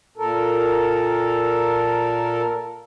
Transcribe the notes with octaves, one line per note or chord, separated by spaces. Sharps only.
A#2 A4 A#4